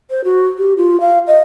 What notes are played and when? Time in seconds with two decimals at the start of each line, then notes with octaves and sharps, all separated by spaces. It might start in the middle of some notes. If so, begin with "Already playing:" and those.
0.11 C5
0.24 F#4
0.58 G4
0.77 F4
1.00 F5
1.27 D#5